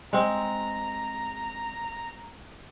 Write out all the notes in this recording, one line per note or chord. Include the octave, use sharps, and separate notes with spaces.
G#3 C4 A#5